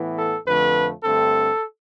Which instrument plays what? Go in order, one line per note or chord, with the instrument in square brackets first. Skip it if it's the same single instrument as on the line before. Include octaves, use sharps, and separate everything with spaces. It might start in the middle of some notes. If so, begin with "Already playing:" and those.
Already playing: [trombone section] A2 E3 B3
A4
F2 D3 F3 A3 B4
G2 D3 A3 C4 A4